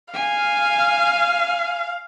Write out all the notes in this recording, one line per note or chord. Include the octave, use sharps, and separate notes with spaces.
F5 G#5